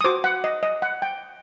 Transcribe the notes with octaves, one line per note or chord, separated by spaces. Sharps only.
D#6
F#4 C5 D6
F#5
D#5
D#5
F#5
G5